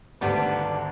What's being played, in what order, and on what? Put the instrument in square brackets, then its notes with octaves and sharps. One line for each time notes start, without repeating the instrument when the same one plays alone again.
[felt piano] G#1 D2 [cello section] D3 [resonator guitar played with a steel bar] G3 B3 D4